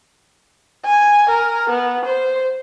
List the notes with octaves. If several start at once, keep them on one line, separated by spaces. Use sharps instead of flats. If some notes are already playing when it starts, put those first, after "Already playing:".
G#5
A#4
B3
C5